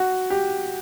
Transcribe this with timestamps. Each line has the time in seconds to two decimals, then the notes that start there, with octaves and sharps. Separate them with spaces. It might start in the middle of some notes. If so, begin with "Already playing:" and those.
Already playing: F#4
0.30 G4